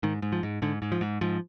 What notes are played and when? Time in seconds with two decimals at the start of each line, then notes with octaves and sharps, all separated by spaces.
0.03 G#2 D#3
0.22 G#2
0.32 F3
0.43 G#2
0.62 G#2 D3
0.82 G#2
0.92 F3
1.01 G#2
1.21 G#2 F3